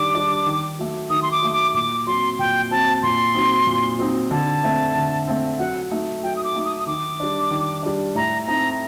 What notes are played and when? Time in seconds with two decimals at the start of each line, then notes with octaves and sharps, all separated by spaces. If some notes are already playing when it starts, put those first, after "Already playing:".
Already playing: D#3 G3 D4 D6
0.15 G3 D4
0.46 D#3
0.79 F#3 A3
1.10 D#3 D#6
1.22 C6
1.32 D6
1.43 F#3 A3
1.53 D6
1.74 A#2 D6
2.07 F#3 C4 C6
2.39 A#2 G5
2.71 F#3 C4 A5
3.03 A#2 C6
3.34 F#3 C4 D#4
3.67 A#2
3.99 F#3 C4 D#4
4.31 D3 A5
4.63 A3 C4
4.95 D3
5.27 A3 C4
5.59 F#3 F#5
5.91 A3 D#4
6.23 F#3 G5
6.36 D#6
6.44 D6
6.55 A3 D#4
6.65 D#6
6.79 D#6
6.87 D#3 D6
7.20 G3 D4
7.51 D#3
7.83 G3 D4
8.15 A2 A#5
8.47 A3 C4 D#4 A#5